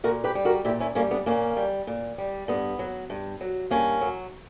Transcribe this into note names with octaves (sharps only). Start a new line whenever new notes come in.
A#2 F#4 A#4
G4 B4
G3
F#4 A#4
A#2 E4 G4
C#4 E4
G3 A#3 C#4
B3 D4
A#2 A#3 C#4
G3
A#2
G3
G2 B3
F#3
G2
F#3
G2 A#3 C#4
F#3